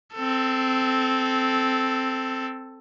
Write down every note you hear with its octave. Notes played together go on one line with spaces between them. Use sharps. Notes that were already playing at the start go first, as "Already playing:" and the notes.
C4 A4